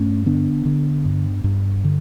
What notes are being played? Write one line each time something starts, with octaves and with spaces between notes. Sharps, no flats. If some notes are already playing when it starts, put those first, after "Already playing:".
Already playing: G2 A3 C#4
D3 B3 D4
D3
G2
G2
D3